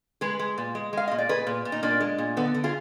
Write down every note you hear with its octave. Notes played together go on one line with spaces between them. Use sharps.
G#3 G#4 B4
G#3
A#2
G#3
G#3 F5
A#2 D#5
D5
A#2 G#4 B4
A#2
A#2
D#4
A#2 A#3 D4
G#3
A#2
D3 B3
D3
F4 G#4